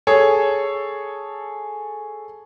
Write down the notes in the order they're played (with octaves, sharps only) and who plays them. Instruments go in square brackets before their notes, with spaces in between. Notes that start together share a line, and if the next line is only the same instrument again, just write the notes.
[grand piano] G#4 A4 C#5